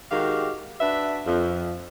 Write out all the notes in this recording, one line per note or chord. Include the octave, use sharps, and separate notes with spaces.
D#3 G#3 F#4 G4 F5
D4 F#4 B4 E5
F2